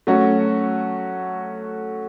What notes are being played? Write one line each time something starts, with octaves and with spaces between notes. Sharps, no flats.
F#3 A3 C#4 F#4